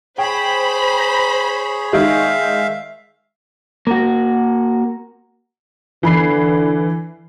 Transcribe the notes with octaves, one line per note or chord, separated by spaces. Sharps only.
G#4 C5 C#5 G5 B5
D#3 G#3 D#4 E5 F5
A#3 F#4
D3 E3 B5 C7